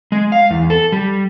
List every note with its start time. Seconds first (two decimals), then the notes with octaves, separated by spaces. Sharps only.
0.12 G#3
0.32 F5
0.51 E2
0.70 A4
0.92 G3